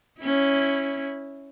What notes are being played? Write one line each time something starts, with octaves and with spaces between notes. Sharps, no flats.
C#4 E4